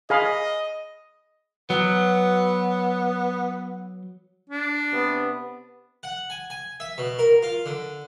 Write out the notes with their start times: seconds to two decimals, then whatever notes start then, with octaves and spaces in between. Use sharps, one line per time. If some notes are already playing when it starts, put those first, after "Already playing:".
0.10 G#4 D#5 F5 B5
1.70 F#3 B3
4.50 D4
4.92 C3 B3
6.03 F#5
6.30 G#5
6.50 G#5
6.80 E5
6.98 B2
7.19 A#4
7.43 F4
7.66 D3